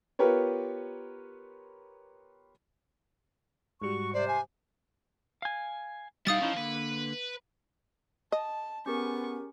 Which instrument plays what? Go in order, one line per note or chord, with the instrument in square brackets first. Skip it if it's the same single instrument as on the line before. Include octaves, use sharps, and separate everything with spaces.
[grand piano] B3 F4 G4 A#4 B4 C#5
[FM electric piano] G#2 G3 [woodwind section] F#4 C#6
[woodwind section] C3 C5 [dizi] D5
[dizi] G#5
[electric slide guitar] F5 G#5
[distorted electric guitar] B2 E4 [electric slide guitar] G3 D#4 [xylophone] F5 D#6 A6
[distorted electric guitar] F3 [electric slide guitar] C#4 D#4 E4
[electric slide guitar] D3 A#3 [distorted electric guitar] B4
[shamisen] D#5 [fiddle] A5
[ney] B3 [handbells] C#4 G4 A#4 [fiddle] G#4 C#6